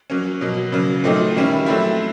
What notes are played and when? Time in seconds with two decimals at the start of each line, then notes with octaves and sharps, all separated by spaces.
0.10 F#3 A#3 C#4
0.41 B2 F#3 A#3
0.72 C#3 F#3 A#3
1.04 A#2 F#3 A3 C4 D#4
1.35 D#3 G3 A#3 C#4 E4
1.66 F#3 A3 C4 E4